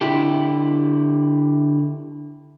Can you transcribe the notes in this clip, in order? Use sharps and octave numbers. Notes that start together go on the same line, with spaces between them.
D3 E4 G4